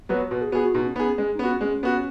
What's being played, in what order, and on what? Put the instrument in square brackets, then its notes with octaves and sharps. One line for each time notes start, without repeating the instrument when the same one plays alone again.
[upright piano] F#3 B3 F#4 B4
[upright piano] B2 [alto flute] B4
[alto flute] G#4
[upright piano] B3 G#4 [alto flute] F#4
[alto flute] F#4
[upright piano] B2 [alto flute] D#4
[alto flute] C#4
[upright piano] B3 G#4 [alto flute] D#4
[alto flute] C#4
[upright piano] G#3 [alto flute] C#4
[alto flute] D#4
[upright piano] B3 [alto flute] C#4
[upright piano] F#4
[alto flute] C#4
[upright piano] G#3 [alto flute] C#4
[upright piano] B3 F#4